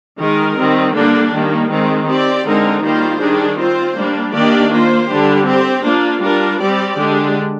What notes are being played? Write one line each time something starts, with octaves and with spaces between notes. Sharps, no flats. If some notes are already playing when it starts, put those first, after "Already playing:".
D#3 G#3 D#4 A#4
D#3 G3 C4
D3 G3 A#3 D4
D#3 G3 A#3
D#3 G#3 C4
C4 G4 D5
D3 G#3 C4 D#4 A#4
D#3 G3 A#3 F4 C5
D#3 G3 D4 G#4
C4 F4 C5
G3 A#3 D4
D#3 A#3 D4 G4 D5
A#3 F4 C5
D3 G3 D4 G4
C4 G4 C5
A#3 D4 F4
G3 D4 F4 A#4
G3 C4 G4 D5
D3 G#3 D4 G4